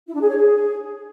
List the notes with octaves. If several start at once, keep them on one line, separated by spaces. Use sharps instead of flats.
E4
D4
G#4
C#5
G#4